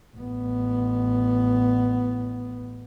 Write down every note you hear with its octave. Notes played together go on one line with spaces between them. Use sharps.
A1 B3